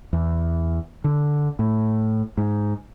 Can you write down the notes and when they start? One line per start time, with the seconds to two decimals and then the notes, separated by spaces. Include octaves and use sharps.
0.13 E2
1.04 D3
1.59 A2
2.37 G#2